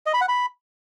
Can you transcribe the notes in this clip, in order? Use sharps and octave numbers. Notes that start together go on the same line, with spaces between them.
D#5
B5
F#5
B5